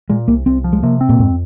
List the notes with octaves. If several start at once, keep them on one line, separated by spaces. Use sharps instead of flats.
A#2 G#3
C2 A#3
C2 C4
F3
G#3
C3 A#3
C4
A#2
F2 G#2